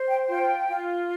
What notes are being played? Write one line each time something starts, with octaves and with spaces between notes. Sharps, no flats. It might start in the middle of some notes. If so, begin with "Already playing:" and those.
Already playing: C5
G5
F4 G5
F4